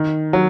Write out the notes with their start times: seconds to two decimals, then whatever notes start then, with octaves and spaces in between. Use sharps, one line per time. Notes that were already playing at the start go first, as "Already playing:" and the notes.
Already playing: D#3
0.33 F#3